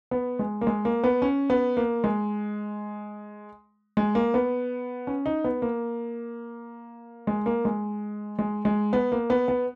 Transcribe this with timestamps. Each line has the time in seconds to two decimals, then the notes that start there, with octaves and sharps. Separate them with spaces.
0.11 B3
0.39 G#3
0.61 A#3
0.67 G#3
0.85 A#3
1.04 B3
1.22 C#4
1.50 B3
1.77 A#3
2.04 G#3
3.97 G#3
4.15 A#3
4.34 B3
5.07 C#4
5.26 D#4
5.44 B3
5.62 A#3
7.27 G#3
7.46 A#3
7.65 G#3
8.39 G#3
8.65 G#3
8.93 B3
9.12 A#3
9.30 B3
9.48 B3